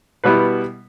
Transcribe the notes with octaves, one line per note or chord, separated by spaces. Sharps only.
B2 G3 B3 E4 B4